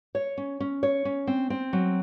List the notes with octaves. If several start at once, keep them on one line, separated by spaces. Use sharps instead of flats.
C#5
C#4
C#4
C#5
C#4
C4
C4
F#3